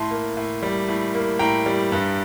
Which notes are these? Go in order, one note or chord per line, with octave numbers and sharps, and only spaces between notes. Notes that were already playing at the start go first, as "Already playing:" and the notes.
Already playing: A2 A5 C6
A#3
A2
G3
A2
A#3
A2 G5 A#5
G3
G2